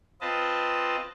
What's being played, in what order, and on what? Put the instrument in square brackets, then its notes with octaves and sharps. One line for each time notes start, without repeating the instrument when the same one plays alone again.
[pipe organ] C4 F4 B4 D#5 A5